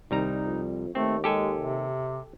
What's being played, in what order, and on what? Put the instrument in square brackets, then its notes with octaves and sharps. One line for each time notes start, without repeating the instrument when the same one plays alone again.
[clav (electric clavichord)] C2 G3 A#5 [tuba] D#3 [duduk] D#4
[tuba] F2
[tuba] D#2 [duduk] A3 [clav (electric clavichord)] C4
[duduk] G#3 [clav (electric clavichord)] G4 A4 G#5
[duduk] C3